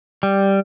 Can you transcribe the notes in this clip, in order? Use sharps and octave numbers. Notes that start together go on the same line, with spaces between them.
G3